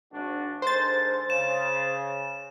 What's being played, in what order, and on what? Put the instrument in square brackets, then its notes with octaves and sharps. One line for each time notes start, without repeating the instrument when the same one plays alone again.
[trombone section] G#1 D4 F#4
[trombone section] G#2 D3 A#4 [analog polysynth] C5 A6
[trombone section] C#3 [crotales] E7